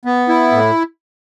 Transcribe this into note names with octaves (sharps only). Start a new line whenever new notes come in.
B3
E4
A2